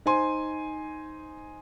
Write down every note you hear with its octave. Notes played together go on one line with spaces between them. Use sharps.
D#4 C5 G#5 C6